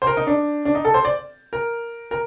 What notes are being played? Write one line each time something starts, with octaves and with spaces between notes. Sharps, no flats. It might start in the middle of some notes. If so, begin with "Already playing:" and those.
C5
A#4
D#4
D4
D4
D#4
A4
C5
D5
A#4
A#4